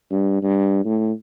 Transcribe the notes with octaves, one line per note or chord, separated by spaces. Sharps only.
G2
G2
A2